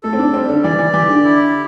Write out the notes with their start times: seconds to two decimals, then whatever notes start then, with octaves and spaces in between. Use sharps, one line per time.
0.03 A3 A4
0.13 C4
0.19 D4
0.33 G3 C4
0.49 D3
0.63 E3 D5
0.79 E3
0.93 E3 G4
1.09 D3
1.24 E4